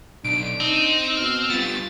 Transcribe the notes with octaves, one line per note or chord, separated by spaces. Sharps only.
B1 D4 D7
C4 D#4
B2 F6
G3 B3 F4 A6